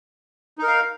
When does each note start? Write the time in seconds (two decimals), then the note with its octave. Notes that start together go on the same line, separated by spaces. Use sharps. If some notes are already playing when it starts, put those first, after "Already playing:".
0.59 D#4
0.63 A#4
0.67 F5